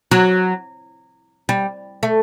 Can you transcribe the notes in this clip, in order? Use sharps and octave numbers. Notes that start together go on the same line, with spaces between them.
F#3
G3
A3